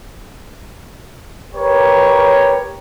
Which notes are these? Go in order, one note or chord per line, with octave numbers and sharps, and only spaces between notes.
G4 A#4 B4 C#5